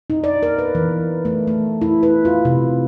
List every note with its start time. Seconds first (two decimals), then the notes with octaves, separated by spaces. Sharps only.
0.10 D#4
0.24 D5
0.43 A#4
0.59 B4
0.75 E3
1.25 A3
1.47 A3
1.81 E4
2.03 B4
2.25 F4
2.45 C3